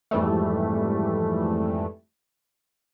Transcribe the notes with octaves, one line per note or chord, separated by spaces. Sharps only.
F2 G#2 E3 G3 A3